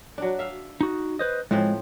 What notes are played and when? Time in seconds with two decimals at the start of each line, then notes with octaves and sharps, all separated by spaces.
0.18 F#3 D4
0.39 E5 F5
0.81 D#4 F#4
1.19 B4 C5 D#5
1.51 A2 F3 G#3 C4